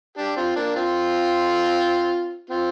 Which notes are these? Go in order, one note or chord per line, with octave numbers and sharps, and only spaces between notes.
D4 G4
C4 F4
A#3 D4
C4 F4
C4 F4